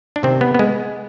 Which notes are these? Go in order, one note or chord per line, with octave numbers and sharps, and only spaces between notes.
D4
C3 D#3 C4
B3
B3
G#3